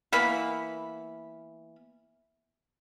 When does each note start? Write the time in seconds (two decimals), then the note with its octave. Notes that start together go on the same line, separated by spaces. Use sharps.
0.12 E3 A#3 B3 B5